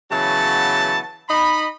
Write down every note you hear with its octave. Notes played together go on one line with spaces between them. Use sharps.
C#3 E3 F#3 B3 A5
D#4 D#5 B5